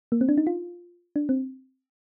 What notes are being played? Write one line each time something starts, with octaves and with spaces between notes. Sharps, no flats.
A#3
C4
D4
D#4
F4
D4
C4